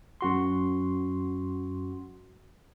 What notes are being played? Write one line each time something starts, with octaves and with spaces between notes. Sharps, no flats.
F#2 F#4 C6